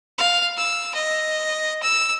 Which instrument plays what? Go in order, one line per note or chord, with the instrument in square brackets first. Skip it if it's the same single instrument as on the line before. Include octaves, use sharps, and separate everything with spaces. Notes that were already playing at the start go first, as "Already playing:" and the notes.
[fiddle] F5
E6
D#5
E6